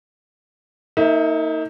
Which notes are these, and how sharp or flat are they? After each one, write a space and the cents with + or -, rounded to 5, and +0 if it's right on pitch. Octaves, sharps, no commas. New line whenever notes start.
A#3 -25 D#4 +30 E5 +0